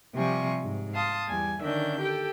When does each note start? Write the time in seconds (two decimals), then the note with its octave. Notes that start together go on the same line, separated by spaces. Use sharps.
0.16 C3 F3 G3 G#5 C#6
0.63 G#2
0.94 F5 A5 C6 D#6
1.28 E2 G3 G#5
1.62 D3 D#3 C#4 D4 E5 G6
1.99 G4 A4 G5